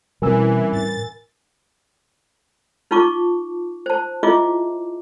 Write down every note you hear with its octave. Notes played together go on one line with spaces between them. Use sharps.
B2 E3 G3 C4 C#4 A#4 G#5 E6
A2 A6
D#4 F4 A5 C#6 D6
C5 A5
E4 F4 G#4 D#5 E5 D6